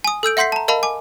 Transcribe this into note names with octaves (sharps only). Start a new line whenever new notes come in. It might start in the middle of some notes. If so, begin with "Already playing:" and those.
G#5 D#6
A4 E6 G6 D7
E5 F#5 C6 G6 B6 C7
A5 A#5
A#4 D#5 F5 A5 B5
G#5 D6